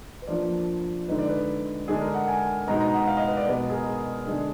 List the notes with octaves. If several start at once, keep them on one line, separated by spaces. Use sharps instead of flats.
B4
F3 A#3 D4 D5
D3 G#3 D#4 B4
D5
B4
D3 G#3 D4 G#4
A#4
F#5
G#5
B2 G#3 D#4 A#5
A#5
F#5
F5
D#5
B4
D5
B2 G#3 B3
G#4
A#4
D3 G#3 D4 G#4